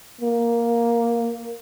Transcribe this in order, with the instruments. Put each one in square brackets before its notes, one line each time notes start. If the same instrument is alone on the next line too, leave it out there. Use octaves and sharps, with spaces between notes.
[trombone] A#3